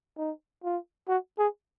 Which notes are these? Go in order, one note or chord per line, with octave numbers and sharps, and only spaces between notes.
D#4
F4
F#4
G#4